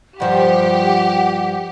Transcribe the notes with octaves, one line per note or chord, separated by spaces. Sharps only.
G2 F3 G4 F#5